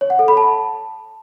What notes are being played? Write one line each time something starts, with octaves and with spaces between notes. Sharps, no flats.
C#5
F#5
A4
B5
A5